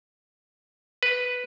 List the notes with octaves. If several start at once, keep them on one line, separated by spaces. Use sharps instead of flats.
B4